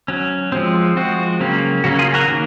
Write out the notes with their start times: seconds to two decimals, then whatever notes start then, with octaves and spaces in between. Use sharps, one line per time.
0.08 F#3 C#4
0.52 F3 G#3 C4
0.96 F3 G#3 C4 F#4
1.40 C#3 F#3 A#3 C#4
1.84 C#3 F#3 A#3 C#4 F#4
1.99 F4 G#4
2.14 F#4 A#4
2.28 D#3 A#3